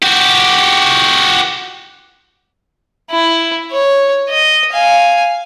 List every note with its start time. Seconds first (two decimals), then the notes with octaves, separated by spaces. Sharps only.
0.02 F#4 G4
3.10 E4
3.71 C#5
4.30 D#5
4.72 F5 G#5